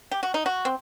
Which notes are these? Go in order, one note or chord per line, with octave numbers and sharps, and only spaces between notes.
G4
F#4
D#4
F#4
C4